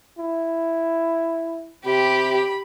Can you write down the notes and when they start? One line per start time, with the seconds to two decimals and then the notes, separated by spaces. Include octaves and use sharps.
0.18 E4
1.85 C3 G4 B5